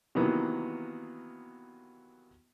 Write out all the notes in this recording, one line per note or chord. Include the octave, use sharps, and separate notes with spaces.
C3 D#3 E3 F#3 A#3 B3